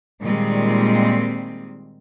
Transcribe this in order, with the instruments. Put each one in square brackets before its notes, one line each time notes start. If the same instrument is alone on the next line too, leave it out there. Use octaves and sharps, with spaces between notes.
[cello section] A#2 D#3 G3 G#3 C4